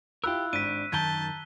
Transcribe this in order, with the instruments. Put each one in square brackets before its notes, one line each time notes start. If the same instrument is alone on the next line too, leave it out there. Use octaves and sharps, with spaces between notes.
[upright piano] E4 F4 B5 [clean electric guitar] G4 A#4 [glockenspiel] E6 F#6
[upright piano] G#1 [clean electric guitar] D4 [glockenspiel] B6 D#7
[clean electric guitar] F#2 D#3 [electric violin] A5 [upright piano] A#5 G6 G#6 [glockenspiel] B6 G7